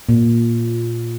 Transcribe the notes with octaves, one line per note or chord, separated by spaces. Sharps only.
A#2